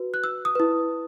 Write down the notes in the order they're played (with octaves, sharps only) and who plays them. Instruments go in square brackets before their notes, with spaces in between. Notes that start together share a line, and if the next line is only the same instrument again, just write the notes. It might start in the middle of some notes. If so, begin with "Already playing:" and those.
Already playing: [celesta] F#4 B4
F#6
E6
D#6
E4 B4